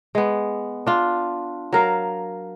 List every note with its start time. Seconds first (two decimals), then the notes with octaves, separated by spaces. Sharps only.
0.15 G#3 B3
0.86 D4 F4
1.72 F#3 A#4 F5